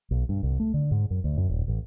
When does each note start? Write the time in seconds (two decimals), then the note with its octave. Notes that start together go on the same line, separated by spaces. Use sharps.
0.11 B1
0.29 G2
0.43 C2
0.60 A3
0.74 D3
0.91 G#2
1.11 F#2
1.24 D2
1.37 F#2
1.49 D#1
1.68 A1